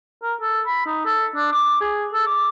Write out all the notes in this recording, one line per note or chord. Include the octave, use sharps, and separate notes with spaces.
A#4
A4
B5
D#4
A4
D4
D6
G#4
A4
D6